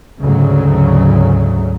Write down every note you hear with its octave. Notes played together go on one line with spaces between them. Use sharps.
D2 G#2 C#3 F#3